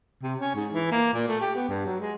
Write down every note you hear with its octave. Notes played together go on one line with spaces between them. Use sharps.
C3
C#4
G#2
E3
A#3
A#2
A3
G4
B3
G2
F#3
G#3